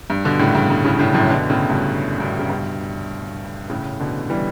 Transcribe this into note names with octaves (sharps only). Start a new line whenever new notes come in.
G2
B2 D3
A2 C#3
G2
G2
A2 C#3
A2 C#3
F#2 A2
B2 D3
A2 C#3
G2 B2
G2 B2
C#3
G2 B2
A2 C#3
B2 D3
E3 G3